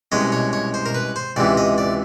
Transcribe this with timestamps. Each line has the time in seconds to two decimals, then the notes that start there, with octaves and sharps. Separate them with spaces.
0.12 C2 B2 G#3 C#4 D#5
0.32 C#5
0.53 C#5
0.74 C5
0.86 A#4
0.95 B4
1.16 C5
1.36 C#2 C3 E3 D5
1.57 D#5
1.78 D5